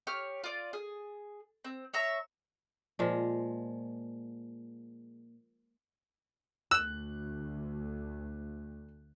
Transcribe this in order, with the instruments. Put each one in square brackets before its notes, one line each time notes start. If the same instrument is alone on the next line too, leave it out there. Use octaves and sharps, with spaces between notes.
[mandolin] G4 C#5 F6
F4 D5
G#4
C4
C#5 E5 A#5
[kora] A#2 F3 G#3
[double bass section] D2 [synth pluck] E6 E7 [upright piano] F#6